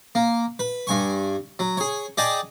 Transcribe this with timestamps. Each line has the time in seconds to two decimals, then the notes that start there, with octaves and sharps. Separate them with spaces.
0.15 A#3
0.59 B4
0.87 G2 G#5 C#6
1.59 F#3
1.77 G#4 C#5
2.17 G#4 D5 D#5 G5 A5